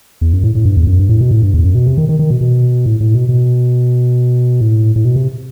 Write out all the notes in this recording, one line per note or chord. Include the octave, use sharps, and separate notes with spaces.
E2
F#2
A2
A2
G2
E2
F#2
G2
A2
B2
A2
G2
E2
F#2
B2
C3
D#3
D#3
D#3
B2
B2
A2
A2
B2
B2
A2
A2
B2
C3